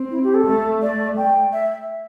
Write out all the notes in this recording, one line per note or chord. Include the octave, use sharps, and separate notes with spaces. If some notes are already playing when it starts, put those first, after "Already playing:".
Already playing: C4
E4
G4
A4
A3
D5
A3 G5
E5